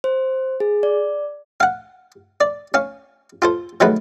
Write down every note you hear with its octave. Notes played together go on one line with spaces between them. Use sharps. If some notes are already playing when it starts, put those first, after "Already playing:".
C5
G#4
D5
F5 F#5
D5
C#4 F5
F4 A4 C5
D#3 F#3 G#3 A3 B4